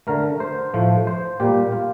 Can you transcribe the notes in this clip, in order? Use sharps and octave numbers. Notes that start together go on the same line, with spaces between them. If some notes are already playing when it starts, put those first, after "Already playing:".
D3 A3 A#4
C5
A2 F3 A3
C5
A#2 G3 A#3 G4
F4